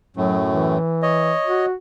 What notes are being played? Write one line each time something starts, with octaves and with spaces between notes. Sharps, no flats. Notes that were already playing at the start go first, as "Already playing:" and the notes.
F#2 A2 F#3
E3
C#5 D#5
F#4